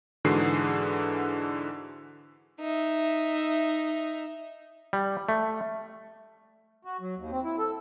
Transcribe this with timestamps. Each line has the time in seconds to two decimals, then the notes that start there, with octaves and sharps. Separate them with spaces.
0.25 G#2 D3 E3 F#4 G#4 C7
2.60 D#4 E5
4.93 G3
5.29 A3
6.85 F#4
7.00 F#3
7.16 D#2
7.31 C4
7.44 E4
7.59 A4